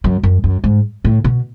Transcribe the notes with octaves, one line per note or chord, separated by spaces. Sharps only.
F#2
F#2
F#2
G#2
A2
B2